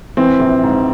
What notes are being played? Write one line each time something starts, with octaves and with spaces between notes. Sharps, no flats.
E3 C4
A#1
G#2